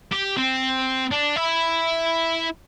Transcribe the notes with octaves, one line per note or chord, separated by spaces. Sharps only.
G4
C4
D4
E4